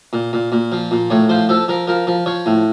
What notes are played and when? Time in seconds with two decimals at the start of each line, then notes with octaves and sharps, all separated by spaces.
0.13 A#2
0.33 A#2
0.52 A#2
0.72 F3
0.91 A#2
1.10 A2 C#5
1.29 F3 C5
1.49 F3 A4
1.68 F3 A#4
1.87 F3 A#4
2.07 F3
2.26 F3 C#5
2.46 A2